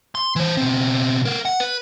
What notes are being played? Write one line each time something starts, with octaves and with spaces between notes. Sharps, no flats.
C6
E3 C5
B2 C4
B3 A#4
F#5
B4